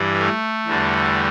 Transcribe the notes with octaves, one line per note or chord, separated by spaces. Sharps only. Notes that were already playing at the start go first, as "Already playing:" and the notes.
Already playing: G2 E3 G3
A3
E2 D3 G3